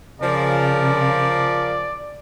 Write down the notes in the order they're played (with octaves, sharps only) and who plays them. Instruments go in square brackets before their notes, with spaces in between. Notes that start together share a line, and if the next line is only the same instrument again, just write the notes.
[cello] C#3 [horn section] F3 A#4 [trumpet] D5